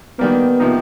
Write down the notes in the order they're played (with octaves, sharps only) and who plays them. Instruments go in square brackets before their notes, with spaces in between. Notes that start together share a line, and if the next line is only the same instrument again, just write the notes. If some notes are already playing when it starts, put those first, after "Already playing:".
[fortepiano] D#3 G3 A#3 [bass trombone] B3
[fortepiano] C3 F3 A#3 D#4